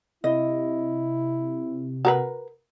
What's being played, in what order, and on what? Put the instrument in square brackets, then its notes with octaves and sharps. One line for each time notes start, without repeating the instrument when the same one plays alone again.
[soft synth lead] C3 [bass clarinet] E4 [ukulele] D#5
[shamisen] F#4 A#4 B4